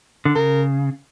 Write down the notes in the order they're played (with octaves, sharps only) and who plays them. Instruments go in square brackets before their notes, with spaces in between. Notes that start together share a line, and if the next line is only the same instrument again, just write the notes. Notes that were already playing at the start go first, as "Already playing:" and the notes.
[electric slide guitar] D3
[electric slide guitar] C#3 [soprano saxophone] A#4